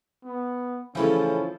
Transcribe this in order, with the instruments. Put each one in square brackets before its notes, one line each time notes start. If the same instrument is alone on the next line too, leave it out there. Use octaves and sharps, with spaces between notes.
[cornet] B3
[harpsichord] A2 C#3 E3 [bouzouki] F3 E4 A4 [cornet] C#4